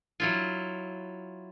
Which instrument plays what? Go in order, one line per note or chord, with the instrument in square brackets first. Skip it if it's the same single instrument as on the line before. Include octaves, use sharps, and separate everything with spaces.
[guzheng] F#3 E4 F4